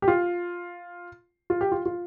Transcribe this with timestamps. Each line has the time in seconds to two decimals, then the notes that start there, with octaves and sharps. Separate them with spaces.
0.02 G4
0.08 F4
1.50 F4
1.61 G4
1.72 F4
1.86 F4